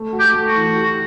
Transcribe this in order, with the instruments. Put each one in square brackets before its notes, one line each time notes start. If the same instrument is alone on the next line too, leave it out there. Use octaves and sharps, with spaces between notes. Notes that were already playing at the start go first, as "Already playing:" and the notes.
Already playing: [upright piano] A3
F#4
[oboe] G4
[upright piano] A3
[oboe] F#4
[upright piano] E3
G4